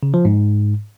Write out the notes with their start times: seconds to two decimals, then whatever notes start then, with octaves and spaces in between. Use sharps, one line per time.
0.03 C#3
0.14 F3
0.25 G#2